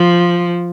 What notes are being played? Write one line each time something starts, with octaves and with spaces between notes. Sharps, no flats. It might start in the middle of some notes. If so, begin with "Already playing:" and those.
Already playing: F3